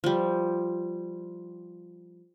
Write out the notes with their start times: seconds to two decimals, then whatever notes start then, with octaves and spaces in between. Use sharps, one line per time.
0.04 F3 G3